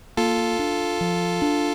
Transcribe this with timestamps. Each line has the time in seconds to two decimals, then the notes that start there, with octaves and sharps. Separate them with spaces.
0.17 A#3 F4 A4
0.59 D4
1.01 F3
1.42 D4